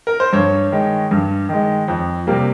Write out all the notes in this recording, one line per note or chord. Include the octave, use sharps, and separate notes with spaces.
A#4
C5
G2 C#5
D#3 G#3
G2
D#3 G#3
F2
C3 G3 A#3